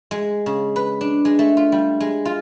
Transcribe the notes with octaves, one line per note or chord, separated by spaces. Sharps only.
G#3
C#3
B4
D4
G#3
A3
F4
G3
G#3
F4